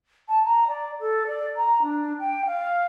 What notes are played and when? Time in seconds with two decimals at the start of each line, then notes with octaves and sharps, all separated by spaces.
0.29 A5
0.45 A#5
0.68 D5
1.00 A4
1.27 D5
1.56 A#5
1.82 D4
2.20 G5
2.46 F5